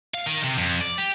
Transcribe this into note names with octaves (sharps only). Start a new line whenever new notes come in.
F5
D#3
C3
F2
D5
G4